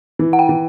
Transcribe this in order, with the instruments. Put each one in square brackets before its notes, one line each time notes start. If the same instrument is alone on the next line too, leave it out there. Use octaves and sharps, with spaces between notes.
[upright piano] E3
[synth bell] F#5
G5
[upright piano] E3